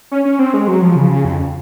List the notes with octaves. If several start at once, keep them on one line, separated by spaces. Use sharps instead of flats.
C#4
C#4
C4
G#3
F#3
F3
C#3
F2